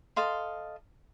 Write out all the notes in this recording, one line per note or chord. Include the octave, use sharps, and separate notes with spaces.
A4 D#5 F5 C6